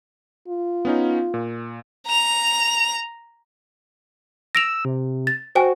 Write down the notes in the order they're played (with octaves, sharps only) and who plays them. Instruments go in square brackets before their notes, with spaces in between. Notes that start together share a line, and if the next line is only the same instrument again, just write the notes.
[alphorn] F4
[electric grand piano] B3 C#4 D#4
A#2
[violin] A#5 F7
[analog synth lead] E6 [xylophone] A#6 D7 F7
[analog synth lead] C3
[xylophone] A6
[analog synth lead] F#4 [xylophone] C5 G5 G#5